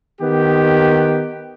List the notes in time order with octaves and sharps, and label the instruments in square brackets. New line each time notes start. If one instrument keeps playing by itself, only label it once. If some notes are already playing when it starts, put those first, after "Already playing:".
[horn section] D#3 B3 G4